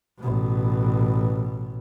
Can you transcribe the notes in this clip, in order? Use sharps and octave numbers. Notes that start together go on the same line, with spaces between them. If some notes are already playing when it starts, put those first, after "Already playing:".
A1 B2